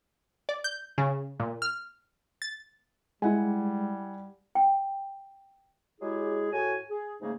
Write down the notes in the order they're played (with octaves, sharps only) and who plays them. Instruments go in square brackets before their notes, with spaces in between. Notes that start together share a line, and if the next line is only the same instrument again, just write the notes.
[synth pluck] D5
G6
C#3
A#2
F6
A6
[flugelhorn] G3 [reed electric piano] G#3 [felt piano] E4 F#5 G#5
[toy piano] G5
[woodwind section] F#3 G#3 E4 G4 G#4
A2 F#4 G#5
G#4
G#2 C#3 A3 A#3 D#4 G#4